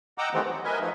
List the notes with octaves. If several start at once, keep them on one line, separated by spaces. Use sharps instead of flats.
D#5 F#5 G5 A#5 D6 E6
D#3 E3 G3 A3 B3 C4
F#3
A#4 B4 D#5 E5 G#5
F3 A3 D#4